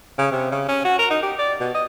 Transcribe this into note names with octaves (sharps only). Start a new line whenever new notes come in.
C#3
C3
C#3
C#4
F#4
A#4
D#4
G4
D5
B2
D#5